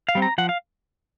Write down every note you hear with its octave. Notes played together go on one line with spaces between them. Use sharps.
F5
G3 C4
A#5
F3 F#5
F5